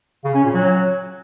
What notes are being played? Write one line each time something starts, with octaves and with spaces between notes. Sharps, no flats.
C#3
C#4
A#2
F#3